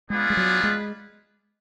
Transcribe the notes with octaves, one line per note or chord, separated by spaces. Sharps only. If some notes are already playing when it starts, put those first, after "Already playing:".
G#3 B3 D4 F4 G#4 B4
G#3
F#3
G#3